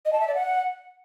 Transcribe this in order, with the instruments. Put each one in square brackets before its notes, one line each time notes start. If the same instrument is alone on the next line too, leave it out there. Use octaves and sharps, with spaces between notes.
[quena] D#5
A5
E5
D5
F#5